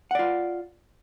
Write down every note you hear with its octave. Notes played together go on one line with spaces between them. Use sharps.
F4 D5 F#5